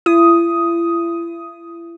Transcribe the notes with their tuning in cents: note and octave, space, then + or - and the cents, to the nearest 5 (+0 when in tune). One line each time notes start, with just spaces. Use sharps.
E4 +40 D#6 +5